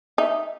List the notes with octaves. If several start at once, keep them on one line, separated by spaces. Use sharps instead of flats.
D#4 E5